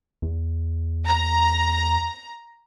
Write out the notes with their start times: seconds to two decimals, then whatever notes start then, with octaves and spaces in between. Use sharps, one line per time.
0.22 E2
1.07 A#5